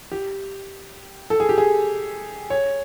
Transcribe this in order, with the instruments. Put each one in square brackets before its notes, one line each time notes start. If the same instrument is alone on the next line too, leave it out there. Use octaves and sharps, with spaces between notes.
[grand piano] G4
A4
G#4
G4
G#4
C#5